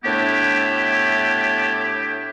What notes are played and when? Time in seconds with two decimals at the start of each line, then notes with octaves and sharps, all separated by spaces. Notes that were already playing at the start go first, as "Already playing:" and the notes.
0.04 A2 A3 B3 D4 E4 G4